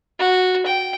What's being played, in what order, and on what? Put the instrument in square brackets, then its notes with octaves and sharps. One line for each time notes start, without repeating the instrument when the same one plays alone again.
[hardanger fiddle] F#4
G5